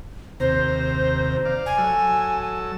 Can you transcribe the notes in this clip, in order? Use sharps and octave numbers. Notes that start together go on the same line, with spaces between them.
D#2 C3 C5 A#5
D5 F5
G#5
F#3 A4 E6